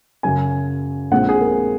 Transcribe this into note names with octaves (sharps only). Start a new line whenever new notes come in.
F#2 C#3 F#3 C#4 G#5
A#1 A#2 G#3 C4 F#5
G#4
A#4